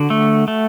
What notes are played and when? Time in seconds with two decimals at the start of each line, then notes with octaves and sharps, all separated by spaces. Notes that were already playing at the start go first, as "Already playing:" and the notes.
Already playing: D3 F#4
0.10 A3
0.48 A3